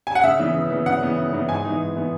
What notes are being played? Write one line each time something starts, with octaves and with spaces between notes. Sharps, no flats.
G#5
F#5
C#3 E5
E3 B3
C#3
E3 B3
C#3 F#5
E3 B3
C#3
E3 B3
G#2 G#5
E3 B3 D#4
G#2
E3 B3 D#4